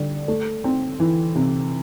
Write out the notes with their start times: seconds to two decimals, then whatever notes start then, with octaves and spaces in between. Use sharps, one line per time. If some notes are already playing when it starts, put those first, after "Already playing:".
Already playing: D3 G3
0.28 A3
0.64 C4
1.00 E3
1.35 C3